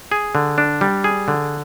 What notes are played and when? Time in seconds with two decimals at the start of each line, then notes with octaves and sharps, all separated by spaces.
0.12 G#4
0.35 D3
0.58 D4
0.81 G3
1.04 G#4
1.28 D3